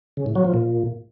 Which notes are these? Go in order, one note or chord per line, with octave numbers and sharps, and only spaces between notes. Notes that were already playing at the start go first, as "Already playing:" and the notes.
C#3
A2
F#3
F3
A#2